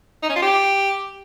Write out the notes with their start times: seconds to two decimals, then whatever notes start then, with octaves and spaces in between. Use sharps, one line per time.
0.23 D#4
0.29 C#4
0.36 F4
0.42 G4